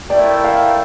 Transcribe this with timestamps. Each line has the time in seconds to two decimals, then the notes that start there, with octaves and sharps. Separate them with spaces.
0.10 A3 E4 A#4 D5 E5 G5
0.44 F5